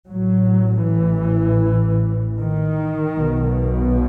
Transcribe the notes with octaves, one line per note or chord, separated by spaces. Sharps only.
A1 A2 F#3
E3
D#3
B1 B2